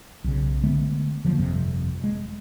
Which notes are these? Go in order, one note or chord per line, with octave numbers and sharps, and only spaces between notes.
B1 C#3
D3 G#3 A3 B3
D3 F3 F#3 A#3
G1 F2 C3
G#3